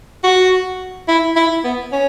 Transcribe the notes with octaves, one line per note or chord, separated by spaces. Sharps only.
F#4
E4
E4
B3
C#4